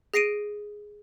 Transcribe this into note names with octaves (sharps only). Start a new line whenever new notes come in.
G#4 A#6 C7 D7 D#7